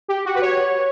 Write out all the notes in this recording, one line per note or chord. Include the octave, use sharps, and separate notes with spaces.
G4
F#4
B4
C#5